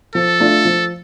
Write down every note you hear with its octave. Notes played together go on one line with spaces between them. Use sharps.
F3 A4
A3 D4 F4
F3